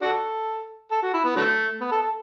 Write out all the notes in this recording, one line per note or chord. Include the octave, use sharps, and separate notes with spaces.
D4 F#4 A4
A4
F#4
E4
B3
D3 F#3 A3
B3
A4
A4